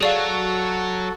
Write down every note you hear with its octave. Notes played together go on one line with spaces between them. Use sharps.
F#3 F#4 G#4 A4 D5 F5